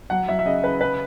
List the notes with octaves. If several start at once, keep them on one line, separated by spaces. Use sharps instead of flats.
F#3 F#5
F#3 E5
E5
C#3 D#5
C#3 B4
C#3 B4